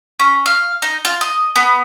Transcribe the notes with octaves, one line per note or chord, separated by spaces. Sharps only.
C#4
F5
D#4
F4
D#5
B3